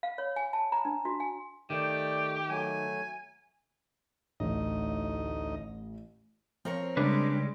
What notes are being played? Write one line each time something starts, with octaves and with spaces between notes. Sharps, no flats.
F5
C#5
G#5
A5
A#5
D4
F#4
G#5
D#3 A3 G4 D5
F#3 A3 G#5
A1 D2 D#4 D#5
F3 C4 A#4 C#5
C#3 G3 G#3 D4 B4